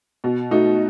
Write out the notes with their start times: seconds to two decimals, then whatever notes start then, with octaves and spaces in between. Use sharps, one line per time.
0.24 B2
0.51 A3 D#4 F#4